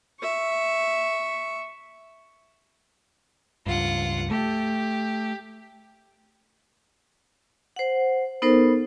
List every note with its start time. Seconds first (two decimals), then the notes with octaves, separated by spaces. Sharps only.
0.21 E5 C#6
3.66 C#2 G2 F4 F#5
4.31 A3 G4
7.76 C5 F#5
8.42 B3 D#4 A4 A#4 C5